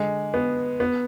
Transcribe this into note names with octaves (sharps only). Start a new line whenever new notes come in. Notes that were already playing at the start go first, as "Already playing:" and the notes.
Already playing: D3 G#3
B3
B3